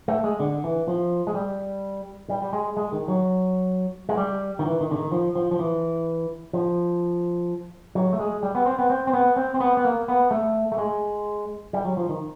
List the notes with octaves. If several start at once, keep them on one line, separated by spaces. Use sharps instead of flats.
A3
G#3
D3
E3
F3
G#3
G3
G3
G3
G#3
G#3
D#3
F#3
G#3
G3
D#3
E3
D#3
D3
D#3
F3
F3
F3
E3
F3
F#3
A3
G#3
G3
B3
C4
B3
C4
C4
B3
C4
C4
B3
B3
A#3
B3
A3
A3
G#3
G3
F#3
F3
D#3